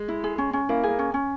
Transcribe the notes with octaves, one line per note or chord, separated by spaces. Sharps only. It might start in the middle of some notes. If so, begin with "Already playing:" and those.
Already playing: G#3
E4
G#4
C#4
C#4
A#3 E4
A#3 G#4
C#4
C#4